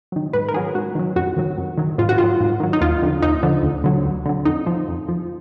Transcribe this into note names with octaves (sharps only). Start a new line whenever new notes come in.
D#3 F#3
G#2 B4
A#4
D#3 F#3 G#4
G#2 F#4
D#3 F#3
F#2 F#4
D#3 F#3
F#2
D#3 F#3
G#2 F4
F#4
D#3 F4
F#3
G#2
D#3 F#3
D#4
D#2 F4
D3 F3
D#2 D#4
D3 F3
D2
D3 F#3
D2
D3 F#3
F2 D#4
F3
F2
F3